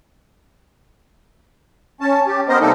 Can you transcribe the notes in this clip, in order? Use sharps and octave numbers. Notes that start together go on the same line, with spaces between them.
C#4 A5
G4
B3 A#4 C5 D#5
C3 G3 A#3 D#4 A4